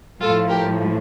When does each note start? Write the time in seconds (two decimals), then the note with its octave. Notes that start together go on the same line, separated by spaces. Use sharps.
0.20 A2 F3 F4 A4
0.49 G4 A#4